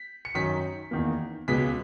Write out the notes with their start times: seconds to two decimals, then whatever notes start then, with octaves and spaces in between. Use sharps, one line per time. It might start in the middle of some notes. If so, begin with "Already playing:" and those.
Already playing: B6
0.25 C#7
0.35 F#2 D#3 F#3 B6
0.91 E2 D#3 A#3
1.48 C#2 B2 G#3 B3 B6